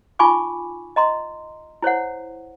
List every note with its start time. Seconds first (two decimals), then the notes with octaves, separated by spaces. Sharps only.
0.19 D#4 F4 G#5 B5 C#6 D6
0.96 D#5 A#5 C6
1.82 E4 C5 C#5 F#5